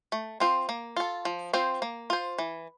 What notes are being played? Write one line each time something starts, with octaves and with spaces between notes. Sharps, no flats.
A3
C4 F4 C5
A#3
F4 A4
F3
C4 F4 C5
A#3
F4 C5
E3